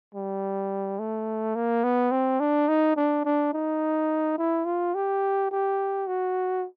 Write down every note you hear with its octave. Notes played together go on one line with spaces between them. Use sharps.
G3
A3
A#3
B3
C4
D4
D#4
D4
D4
D#4
E4
F4
G4
G4
F#4